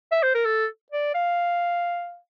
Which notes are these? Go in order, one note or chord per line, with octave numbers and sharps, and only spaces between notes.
E5
C5
A#4
A4
D5
F5